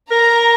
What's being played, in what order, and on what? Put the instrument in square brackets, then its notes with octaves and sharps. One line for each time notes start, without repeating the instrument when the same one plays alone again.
[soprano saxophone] A#4 [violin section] A#5